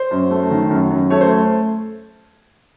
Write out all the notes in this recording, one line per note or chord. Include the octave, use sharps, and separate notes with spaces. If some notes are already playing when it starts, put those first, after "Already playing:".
Already playing: C5
F#2
A3
D#3
F#2
F#2
A3 C#5
C5